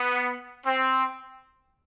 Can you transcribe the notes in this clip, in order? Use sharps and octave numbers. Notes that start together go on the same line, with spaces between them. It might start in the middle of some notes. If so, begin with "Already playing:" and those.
Already playing: B3
C4